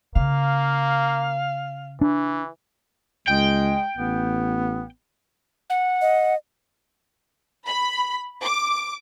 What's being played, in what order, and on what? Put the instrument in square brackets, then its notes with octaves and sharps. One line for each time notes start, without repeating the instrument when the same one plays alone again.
[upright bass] C#3 [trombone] A#3 [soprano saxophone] F5
[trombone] E3 [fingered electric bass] D4
[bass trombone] C#2 [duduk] G#3 [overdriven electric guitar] G5
[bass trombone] A1 [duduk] B3
[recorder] F#5
[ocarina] D#5
[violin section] B5
D6